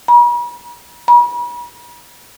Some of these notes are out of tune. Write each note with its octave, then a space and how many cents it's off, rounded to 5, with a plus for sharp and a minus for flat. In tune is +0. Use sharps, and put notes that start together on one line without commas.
B5 -45
B5 -40